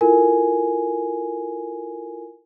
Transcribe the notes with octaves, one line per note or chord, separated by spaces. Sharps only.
E4 F4 A4 A#4 G#5